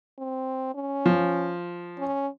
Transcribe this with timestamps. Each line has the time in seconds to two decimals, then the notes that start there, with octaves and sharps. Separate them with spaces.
0.19 C4
0.75 C#4
1.06 F3
1.98 C#4